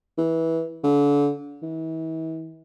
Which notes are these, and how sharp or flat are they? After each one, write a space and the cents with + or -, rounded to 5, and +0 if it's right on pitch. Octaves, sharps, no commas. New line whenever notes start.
E3 -15
D3 -35
E3 -40